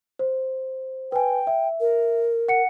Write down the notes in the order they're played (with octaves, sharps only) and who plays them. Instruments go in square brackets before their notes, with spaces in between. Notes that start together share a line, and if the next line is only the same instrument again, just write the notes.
[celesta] C5
[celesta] B4 G#5 [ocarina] G5
[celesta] E5
[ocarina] A#4
[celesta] F#5 C#7